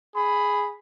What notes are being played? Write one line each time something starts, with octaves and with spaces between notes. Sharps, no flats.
G#4 B5